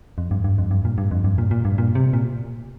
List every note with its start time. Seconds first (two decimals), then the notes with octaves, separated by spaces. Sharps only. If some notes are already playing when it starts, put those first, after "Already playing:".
0.18 F2
0.31 G2
0.44 G2
0.58 F2
0.71 G2
0.85 A#2
0.98 G2
1.11 F2
1.24 G2
1.38 A#2
1.51 A#2
1.65 G2
1.78 A#2
1.95 C3
2.13 A#2